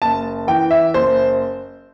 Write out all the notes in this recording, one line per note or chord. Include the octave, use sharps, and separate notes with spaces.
F#1 A5
E3 G5
E5
F#1 C5